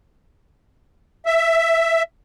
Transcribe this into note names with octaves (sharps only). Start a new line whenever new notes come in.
E5